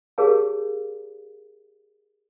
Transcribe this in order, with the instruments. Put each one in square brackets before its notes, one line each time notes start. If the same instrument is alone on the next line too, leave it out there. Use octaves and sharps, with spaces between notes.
[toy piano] G4 G#4 A#4 C#5 F5 A5